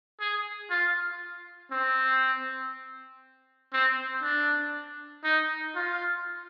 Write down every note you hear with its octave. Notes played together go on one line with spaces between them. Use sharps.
G#4
F4
C4
C4
D4
D#4
F4